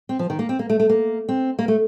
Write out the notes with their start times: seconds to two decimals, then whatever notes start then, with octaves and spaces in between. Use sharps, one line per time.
0.09 C4
0.19 F3
0.30 D#3
0.39 A#3
0.49 C4
0.59 A#3
0.70 A3
0.80 A3
0.89 A#3
1.29 C4
1.59 A#3
1.68 A3